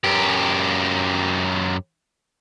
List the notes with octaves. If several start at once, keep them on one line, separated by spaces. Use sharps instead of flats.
F#2 G4